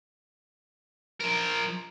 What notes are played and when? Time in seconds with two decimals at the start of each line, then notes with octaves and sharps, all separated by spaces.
1.20 F3 A#4